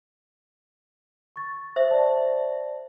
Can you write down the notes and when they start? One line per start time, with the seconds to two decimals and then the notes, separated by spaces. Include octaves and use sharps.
1.36 C#6 A6
1.76 C5 E5
1.91 D5 A5